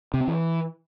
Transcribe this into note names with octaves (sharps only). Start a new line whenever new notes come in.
C3
C4
E3